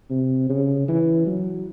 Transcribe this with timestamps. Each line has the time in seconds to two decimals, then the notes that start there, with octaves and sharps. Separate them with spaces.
0.10 C3
0.49 C#3
0.88 E3
1.27 F#3